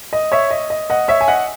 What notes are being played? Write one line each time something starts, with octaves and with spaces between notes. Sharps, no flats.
D#5
C#5 E5
D#5
D#5
D#5 F#5
C#5 E5
G#5
D#5 F#5